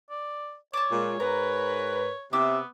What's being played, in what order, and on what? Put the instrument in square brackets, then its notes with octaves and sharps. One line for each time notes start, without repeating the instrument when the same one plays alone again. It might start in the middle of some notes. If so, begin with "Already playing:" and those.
[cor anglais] D5
[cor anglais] C#5 [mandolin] D5 A5
[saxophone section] A#2 G#3
[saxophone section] G#2 A#4 B4 [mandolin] A#5
[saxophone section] C3 E5 [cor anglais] B3 [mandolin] D6 E6